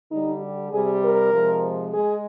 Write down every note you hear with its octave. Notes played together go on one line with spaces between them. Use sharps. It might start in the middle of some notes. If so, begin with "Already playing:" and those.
D3 G3 D#4
G4
C3 G3 G#4
A#4
C3 F3 G#3
G#3 G#4